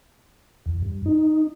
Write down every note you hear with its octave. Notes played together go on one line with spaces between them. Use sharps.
E2
G2
D#4